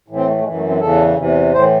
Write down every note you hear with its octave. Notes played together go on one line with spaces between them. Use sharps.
A2 E3
C4
A3
A3
F#2 E3 G#3
A3
C4
E2 C#3 E3 A4
E2 C3 E3
A2 E3 C5